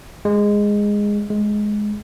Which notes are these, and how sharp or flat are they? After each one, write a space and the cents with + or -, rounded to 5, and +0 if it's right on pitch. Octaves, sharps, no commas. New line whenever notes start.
G#3 -10
G#3 +10